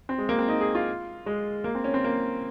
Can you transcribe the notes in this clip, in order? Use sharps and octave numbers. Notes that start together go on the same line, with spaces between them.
C4
G#3
A#3
C4
D#4
G#4
F4
G#3
A#3
C4
C#4
C4
A#3